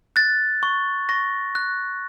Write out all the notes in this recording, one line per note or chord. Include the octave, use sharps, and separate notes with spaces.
F#6 A6
C#6
C#6 A#6
F#6